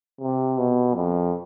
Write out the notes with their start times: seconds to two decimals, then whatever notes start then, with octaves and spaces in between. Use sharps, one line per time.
0.21 C3
0.58 B2
0.95 F2